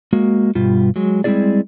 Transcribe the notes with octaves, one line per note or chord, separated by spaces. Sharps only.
G#3 A#3 F#4
G2 B2 G3 F4
F#3 G#3
G3 G#3 C4 E4 G#4 D5